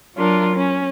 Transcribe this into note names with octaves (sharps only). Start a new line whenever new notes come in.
F#3 D4 F4 A#4
C#4